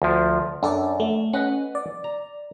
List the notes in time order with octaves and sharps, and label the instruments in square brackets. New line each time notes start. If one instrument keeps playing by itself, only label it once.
[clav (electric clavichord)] D2 F3
[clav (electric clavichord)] F#2 [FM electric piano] D4 A4 D5
[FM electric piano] A3
[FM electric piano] C#4 [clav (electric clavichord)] B4 D#5 F#5
[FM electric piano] D5
[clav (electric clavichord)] A#5